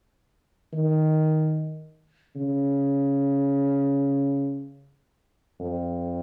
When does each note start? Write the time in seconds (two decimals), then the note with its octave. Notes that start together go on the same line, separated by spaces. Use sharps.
0.73 D#3
2.36 C#3
5.60 F2